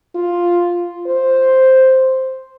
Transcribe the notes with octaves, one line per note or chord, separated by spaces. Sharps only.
F4
C5